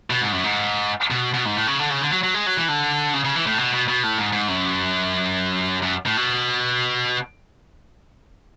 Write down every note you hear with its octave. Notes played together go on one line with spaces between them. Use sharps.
B2
G#2
F#2
G#2
B2
B2
G#2
A2
C#3
D3
C#3
D3
F#3
F#3
G#3
F#3
E3
D3
C#3
C#3
E3
A2
B2
B2
B2
A2
G#2
G#2
F#2
F#2
A2
B2